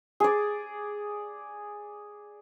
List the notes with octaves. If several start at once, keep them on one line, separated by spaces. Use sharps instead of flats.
G#4 D5